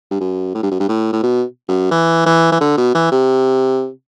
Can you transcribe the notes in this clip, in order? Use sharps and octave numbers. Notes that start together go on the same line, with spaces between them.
G2
F#2
A2
G2
F#2
G2
A2
A2
B2
F#2
E3
E3
E3
D3
B2
E3
C3